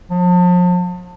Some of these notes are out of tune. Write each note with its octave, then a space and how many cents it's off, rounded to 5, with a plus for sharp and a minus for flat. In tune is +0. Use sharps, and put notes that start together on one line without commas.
F3 +40